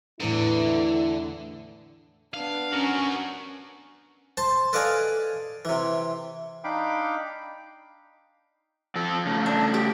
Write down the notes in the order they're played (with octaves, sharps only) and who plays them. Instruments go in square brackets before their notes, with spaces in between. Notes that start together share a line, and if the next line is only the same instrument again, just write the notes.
[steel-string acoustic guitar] E2 A2 E3 [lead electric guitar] D3 [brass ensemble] E4
[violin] B3 D4 [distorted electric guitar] F5
[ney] C#4 [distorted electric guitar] F#4 A#4
[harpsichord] C5 A5
A4 B4 D5 D#5 F5 G#5
C3 E3
[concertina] D4 D#4 F5 G5 B5 D6
[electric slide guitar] F3 A4
C#3 A3
[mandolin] D4
G4